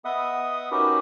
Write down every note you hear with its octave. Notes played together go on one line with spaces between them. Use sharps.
B3 D#5 E5 F#5 D#6
C#4 D#4 F#4 G4 A#4 B4